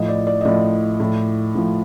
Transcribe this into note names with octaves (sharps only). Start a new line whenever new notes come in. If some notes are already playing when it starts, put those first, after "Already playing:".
Already playing: A2 F3 D#5
D5
D5
D#5
A2 F3 D5
A2 F3
A2 F3